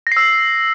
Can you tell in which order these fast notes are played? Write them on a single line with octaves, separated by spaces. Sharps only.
A#6 C7 E6